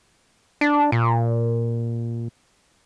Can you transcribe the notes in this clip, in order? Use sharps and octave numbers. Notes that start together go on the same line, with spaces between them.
D4
A#2